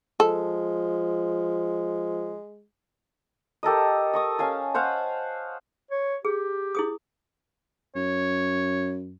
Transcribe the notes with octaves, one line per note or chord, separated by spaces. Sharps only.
F3 G#3 A4
G4 A4 A#4 D#5
D#5 C#6 D#6
C#4 F5 G#5 A5
C5 C#5 F5 F#5
C#5
G4 G#4
E4 G#4 D#6
F#2 C#5